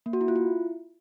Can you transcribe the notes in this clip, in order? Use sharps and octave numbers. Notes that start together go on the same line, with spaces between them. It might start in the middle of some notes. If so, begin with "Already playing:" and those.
A#3
F#4
E4
F4
E4